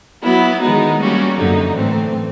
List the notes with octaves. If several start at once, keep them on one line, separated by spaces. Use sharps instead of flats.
F#3 B3 E4
D#3 G#3 B3 D#4
G3 A#3 C#4 F#4
F#2 D3 F#3 A#3 D#4
A2 E3 A3 C4